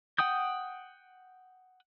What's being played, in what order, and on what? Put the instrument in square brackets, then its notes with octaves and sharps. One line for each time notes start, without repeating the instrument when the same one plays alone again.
[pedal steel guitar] F#5 G5 D#6 G6